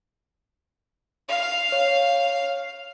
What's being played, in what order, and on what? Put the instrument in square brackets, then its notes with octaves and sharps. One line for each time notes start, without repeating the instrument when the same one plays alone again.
[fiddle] F5
[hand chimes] C#5